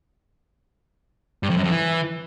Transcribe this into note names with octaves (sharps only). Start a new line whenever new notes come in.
G2
F2
F#2
F2
E3